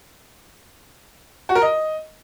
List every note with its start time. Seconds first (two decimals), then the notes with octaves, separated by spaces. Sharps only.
1.49 F#4
1.55 A#4
1.62 D#5